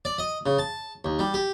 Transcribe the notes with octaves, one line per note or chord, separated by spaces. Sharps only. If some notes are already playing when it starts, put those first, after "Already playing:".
D5
D#5
C#3
A5
D#2
G3
G4